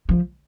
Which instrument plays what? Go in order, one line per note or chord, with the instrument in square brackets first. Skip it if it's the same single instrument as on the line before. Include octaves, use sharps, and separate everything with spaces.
[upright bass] F3